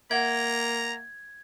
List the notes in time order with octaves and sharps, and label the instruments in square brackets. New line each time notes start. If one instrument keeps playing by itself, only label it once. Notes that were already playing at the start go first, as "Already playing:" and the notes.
[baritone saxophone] A#3 [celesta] E5 F#5 [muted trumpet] A#5 [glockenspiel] G#6